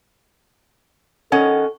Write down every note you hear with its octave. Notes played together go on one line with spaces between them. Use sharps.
D#3 C#4 A4 F#5